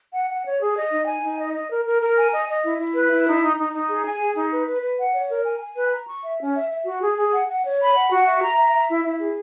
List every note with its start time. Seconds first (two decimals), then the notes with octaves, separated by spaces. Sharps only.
0.13 F#5
0.29 F#5
0.45 C#5
0.60 G#4
0.76 D#5
0.91 D#4
1.07 G#5
1.23 D#4
1.38 D#5
1.53 D#5
1.70 A#4
1.85 A#4
2.01 A#4
2.17 G#5
2.32 D#5
2.48 D#5
2.63 E4
2.78 E4
2.94 B4
3.10 E4
3.26 D#4
3.42 D#4
3.57 D#4
3.73 D#4
3.88 G#4
4.04 G#5
4.20 G#4
4.36 D#4
4.51 B4
4.66 B4
4.82 B4
4.98 F#5
5.14 C#5
5.29 A#4
5.44 G#5
5.60 G#5
5.75 B4
5.92 A#5
6.07 C#6
6.23 E5
6.38 C#4
6.54 E5
6.70 E5
6.85 F#4
7.02 G#4
7.17 G#4
7.32 F#5
7.48 F#5
7.64 C#5
7.80 B5
7.94 F#5
8.10 F#4
8.26 E5
8.42 A#5
8.57 E5
8.73 E5
8.89 E4
9.05 E4
9.20 G#4